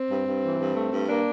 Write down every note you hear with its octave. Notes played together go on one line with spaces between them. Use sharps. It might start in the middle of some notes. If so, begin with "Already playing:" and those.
Already playing: C4
G2
G2
E3
G2
A3
G2
A#3 D4